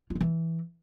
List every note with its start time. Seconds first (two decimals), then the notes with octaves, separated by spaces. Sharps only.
0.10 F4
0.15 D#3
0.21 E3